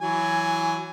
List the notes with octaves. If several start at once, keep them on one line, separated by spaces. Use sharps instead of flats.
E3 F#3 G#5